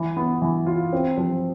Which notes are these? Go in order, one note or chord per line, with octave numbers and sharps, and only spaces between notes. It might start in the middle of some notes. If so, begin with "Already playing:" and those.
Already playing: E3
B3
E3
F4
C4
F3